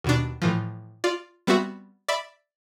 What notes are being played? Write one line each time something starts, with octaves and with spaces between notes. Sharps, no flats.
D#2 B2 D4
A2 E3 F3
F4 D5
G3 B3 C4 F#4 E5
D5 E5 B5